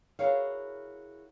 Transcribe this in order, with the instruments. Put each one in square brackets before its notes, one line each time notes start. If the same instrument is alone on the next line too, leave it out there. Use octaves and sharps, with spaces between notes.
[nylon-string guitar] E4 F#4 G#4 A#4 C#5 F5